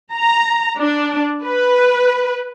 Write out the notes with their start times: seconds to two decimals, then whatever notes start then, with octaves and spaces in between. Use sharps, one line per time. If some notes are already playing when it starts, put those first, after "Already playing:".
0.15 A#5
0.79 D4
1.44 B4